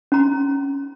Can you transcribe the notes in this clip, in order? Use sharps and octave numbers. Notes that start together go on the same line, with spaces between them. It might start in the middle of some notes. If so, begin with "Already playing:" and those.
C#4 A#5